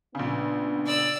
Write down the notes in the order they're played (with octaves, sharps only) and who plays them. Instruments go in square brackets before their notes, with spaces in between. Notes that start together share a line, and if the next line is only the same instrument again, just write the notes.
[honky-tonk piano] A#1 C#3 [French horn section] B3 D4
[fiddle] D5 E6